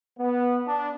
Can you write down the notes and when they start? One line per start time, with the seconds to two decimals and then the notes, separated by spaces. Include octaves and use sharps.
0.18 B3
0.67 D4